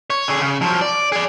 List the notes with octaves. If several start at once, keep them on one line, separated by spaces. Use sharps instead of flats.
C#5
D3 G#4
C#3
F3 F#3
D5
G#4 D5